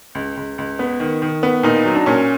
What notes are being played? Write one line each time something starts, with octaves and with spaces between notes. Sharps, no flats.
C#2
C#2
C#2
B3
D#3
D#3
B3
A#2 D#4
F#3
D4
A#2 C#4